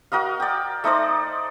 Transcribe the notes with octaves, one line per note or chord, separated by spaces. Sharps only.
F#4 A#4 D#5 F5
D5 G5
A3 D#4 C5 D5